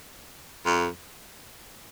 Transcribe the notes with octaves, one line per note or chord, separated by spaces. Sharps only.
F2